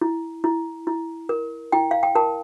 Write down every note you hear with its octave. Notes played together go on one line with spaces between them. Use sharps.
E4
E4
E4
A#4
E4 G5
F5
G5
A#4 A5